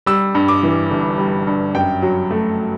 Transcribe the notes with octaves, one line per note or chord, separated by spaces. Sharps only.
G3 E6
G2
D6
E3
G1
G3
G2
F#2 G5
F#3
A3